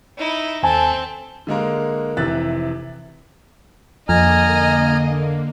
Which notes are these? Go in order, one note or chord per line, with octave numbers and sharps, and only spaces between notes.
D#4 E4
D#2 C4 A4 G#5 A5
D3 G#3 A#3 A#4
F1 C3 E3 E5 F#6 A6
F2 D3 A#3 D#5 G#5 A#5 F6